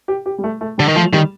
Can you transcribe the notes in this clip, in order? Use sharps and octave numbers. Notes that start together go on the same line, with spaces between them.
G4
G4
G3
A3
A3
D3 G3
D#3
F3 A3
D#3 G3